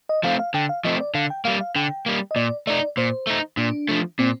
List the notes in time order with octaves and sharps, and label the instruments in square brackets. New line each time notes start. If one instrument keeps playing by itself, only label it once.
[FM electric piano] D#5
[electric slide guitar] F3 A3 C4 [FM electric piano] F5
[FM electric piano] F5
[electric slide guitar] D3 [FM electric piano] G5
[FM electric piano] F5
[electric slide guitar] F3 A3 C4 [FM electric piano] D#5
[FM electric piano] D5
[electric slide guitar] D3 [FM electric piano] F5
[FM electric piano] G5
[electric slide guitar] G3 A#3 [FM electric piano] F5
[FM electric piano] F5
[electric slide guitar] D3 [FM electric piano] G5
[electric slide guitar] G3 A#3
[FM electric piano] D#5
[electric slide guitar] A#2 [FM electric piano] D5
[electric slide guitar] A3 D#4 [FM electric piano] D5
[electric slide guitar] A#2 [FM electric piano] C5
[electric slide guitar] A3 D#4
[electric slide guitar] A#2 [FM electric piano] D4
[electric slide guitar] F3 A3
[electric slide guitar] A#2 [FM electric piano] C4